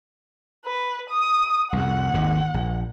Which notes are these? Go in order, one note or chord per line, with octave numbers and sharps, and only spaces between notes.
B4
D#6
C2 F2 F#5
G#1 D#2 D#3
A#1